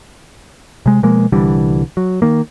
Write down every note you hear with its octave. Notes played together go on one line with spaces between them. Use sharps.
C3 G#3
B2 F3 G#3 A#3
C2 D3 E3 G3
F#3
D#3 A#3